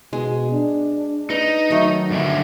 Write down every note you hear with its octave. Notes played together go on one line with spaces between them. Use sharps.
B2 G#3
D4
D#4 B4
D#3 F#3 A3
G2 D3 E4